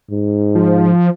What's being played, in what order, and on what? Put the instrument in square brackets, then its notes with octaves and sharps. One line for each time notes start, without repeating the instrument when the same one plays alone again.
[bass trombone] G#2
[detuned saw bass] F3